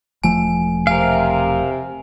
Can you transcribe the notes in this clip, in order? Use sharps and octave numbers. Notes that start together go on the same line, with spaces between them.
E1 F3 A3 G#5
C3 A#4 F5 G#5